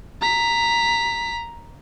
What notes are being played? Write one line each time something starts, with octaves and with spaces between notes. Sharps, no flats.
A#5 B6